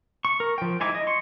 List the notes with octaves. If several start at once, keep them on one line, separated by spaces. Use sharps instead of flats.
C#6
A#4
F3 G5
G#3 D#4 E4 G#5 D6
D#5
C6 C#6